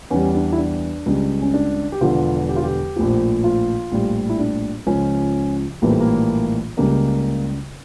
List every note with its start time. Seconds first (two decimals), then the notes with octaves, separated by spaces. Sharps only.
0.11 E2 E3 G3 C#4
0.35 D4
0.53 E4
0.58 D4
1.06 C#2 C#3 G3
1.42 C#4
1.54 D4
1.92 G4
2.01 E1 E2 D3 F3 F4
2.49 G4
2.56 F4
2.64 G4
2.96 A#1 A2 F3
3.44 F4
3.92 A#1 A2 G3
4.29 E4
4.39 D4
4.87 C#2 C#3 F3 C#4
5.82 A#1 A2 E3 G3 A#3
5.91 A3
6.00 A#3
6.77 C#2 C#3 G3 A#3